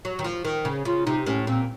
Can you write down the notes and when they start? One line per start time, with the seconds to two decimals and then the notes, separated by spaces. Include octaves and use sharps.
0.05 F#3
0.19 D#3
0.24 F3
0.45 D#3
0.65 C#3
0.85 C#3 F4
1.06 C3 D#4
1.26 A2 C#4
1.47 A#2 C4